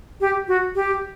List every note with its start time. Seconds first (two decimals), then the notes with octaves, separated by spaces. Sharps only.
0.21 G4
0.48 F#4
0.75 G4